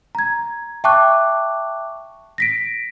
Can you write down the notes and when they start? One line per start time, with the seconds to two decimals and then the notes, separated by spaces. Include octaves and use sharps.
0.15 A#5 G#6
0.84 E5 G5 A5 C#6 D6 F#6
2.38 A#6 B6 D7